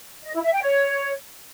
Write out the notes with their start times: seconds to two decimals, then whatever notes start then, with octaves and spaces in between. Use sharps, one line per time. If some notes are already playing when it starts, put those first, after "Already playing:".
0.23 D#5
0.33 E4
0.43 E5
0.52 G5
0.62 C#5